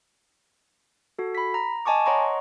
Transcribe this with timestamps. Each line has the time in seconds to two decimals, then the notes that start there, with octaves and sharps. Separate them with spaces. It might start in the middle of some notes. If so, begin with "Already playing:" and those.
1.19 F#4 A4
1.35 B5 B6
1.54 A#5
1.85 D#5 G#5 A5 C#6 D6
2.06 C#5 D#5 F#5 A#5 C6 C#6